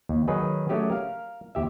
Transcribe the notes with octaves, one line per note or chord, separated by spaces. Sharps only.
D#2
D#3 F#3 D#4 G#4 B4
F#3 A3 C#4 G4 G#4
A#4 F5
D#2 G4 E5